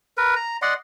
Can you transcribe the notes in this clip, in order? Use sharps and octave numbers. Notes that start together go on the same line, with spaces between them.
A#4 B4
A#5
D5 D#5 F#5 C6